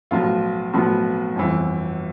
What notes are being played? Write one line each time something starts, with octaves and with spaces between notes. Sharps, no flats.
B1 A2 F3 B3 F4
B1 A2 F3 B3 F4
G1 F2 E3